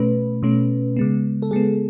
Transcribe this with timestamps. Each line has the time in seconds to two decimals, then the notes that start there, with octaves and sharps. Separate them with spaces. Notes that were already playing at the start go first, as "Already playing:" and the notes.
Already playing: B2 A3 C#4 B4
0.43 B2 A3 C#4
0.96 C#3 G#3 B3
1.42 A4
1.51 C#3 G#3 B3 G#4